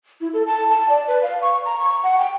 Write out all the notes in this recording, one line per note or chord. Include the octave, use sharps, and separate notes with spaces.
E4
A4
A5
A5
D5
B4
F5
C#6
A#5
C#6
F#5
G5